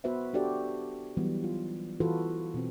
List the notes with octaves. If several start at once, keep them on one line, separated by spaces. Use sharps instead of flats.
B3 F#4 B4 C5 E5
D4 F#4 G4 A4 D5
E3 F#3 G3 B3
F4
E3 F4 F#4 A4 B4
B2 C4